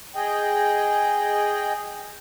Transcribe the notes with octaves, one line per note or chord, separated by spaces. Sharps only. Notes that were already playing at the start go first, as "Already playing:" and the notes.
G#4 D#5 G5